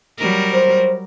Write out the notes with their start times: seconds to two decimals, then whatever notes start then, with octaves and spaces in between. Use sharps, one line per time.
0.18 F#3 G3 A#4
0.53 C5